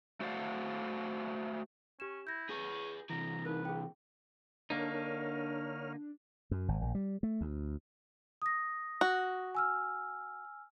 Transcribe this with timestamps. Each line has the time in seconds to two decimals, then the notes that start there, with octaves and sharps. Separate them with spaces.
0.20 A3 F#4 C5 D5 F5 F#5
2.00 C#4 G4 E7
2.27 E4 G6 A#6
2.50 G#4 B4 C#5
3.10 C3 E3 A#5
3.45 D#4 A#4 B4
3.65 G#4 G5
4.70 D3 A#3 D4 D#4 A#4 C#5 F6
4.94 D4
6.51 F#2
6.68 G#1
6.82 A#1
6.95 G3
7.23 A3
7.41 D2
8.42 D#6 A#6
9.01 F#4
9.55 G#5 E6 F6